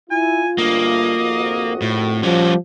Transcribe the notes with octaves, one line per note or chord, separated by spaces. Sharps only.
E4 F4 G#5
D2 G2 A#3 D#5
G#1 F2 F#4
A2
F3 G3 C#4